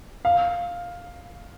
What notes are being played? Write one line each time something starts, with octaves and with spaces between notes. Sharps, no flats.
F5